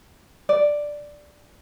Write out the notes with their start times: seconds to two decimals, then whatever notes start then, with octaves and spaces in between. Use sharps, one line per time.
0.49 D5